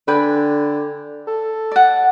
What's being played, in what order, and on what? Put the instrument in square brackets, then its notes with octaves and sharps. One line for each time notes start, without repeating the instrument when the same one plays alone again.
[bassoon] D3 [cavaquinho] B4 G5 G#5
[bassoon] A4
[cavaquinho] D5 F#5